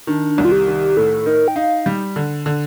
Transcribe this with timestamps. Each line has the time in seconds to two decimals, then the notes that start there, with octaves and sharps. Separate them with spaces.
0.07 D#3 D4
0.38 C2
0.45 F4
0.52 G4
0.67 D#3
0.97 A2 A4
1.26 D#4 A#4
1.48 G5
1.56 D#4 F5
1.86 G3
2.16 D3
2.46 D3